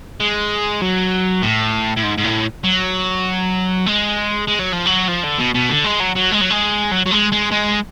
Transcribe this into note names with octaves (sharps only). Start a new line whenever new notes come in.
G#3
F#3
A2
A2
G#2
G#2
A2
F#3
G#3
G#3
F#3
F3
F#3
F3
D3
B2
B2
D3
G#3
F#3
F#3
G#3
F#3
G#3
F#3
F#3
G#3
G#3
G#3